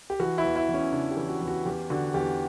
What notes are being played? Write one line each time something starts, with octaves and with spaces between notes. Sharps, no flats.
G4
E3 F#4
E4
E2
E4
E2
C#4
C#3 D4
G4
E3
F#4
E2
F#4
E2 G4
D3 F#4
E2 G4